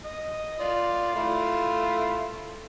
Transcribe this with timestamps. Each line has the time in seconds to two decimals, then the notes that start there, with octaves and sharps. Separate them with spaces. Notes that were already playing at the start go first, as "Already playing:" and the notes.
0.05 D#5
0.60 F4 D5
1.16 A3 E4 F4